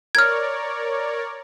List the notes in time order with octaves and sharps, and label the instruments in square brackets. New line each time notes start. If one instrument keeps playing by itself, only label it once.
[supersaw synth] A#4 C#5 D5 [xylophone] F6 G#6